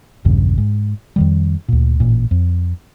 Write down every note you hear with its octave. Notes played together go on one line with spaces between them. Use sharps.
A#1 E2 G2 C#3
G#2
F2 D#3 G3
D2 A#2
A1 A#2
F2